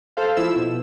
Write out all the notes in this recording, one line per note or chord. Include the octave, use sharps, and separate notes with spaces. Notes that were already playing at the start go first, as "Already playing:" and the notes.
A4 C5 F5
F3 E4 E6
B2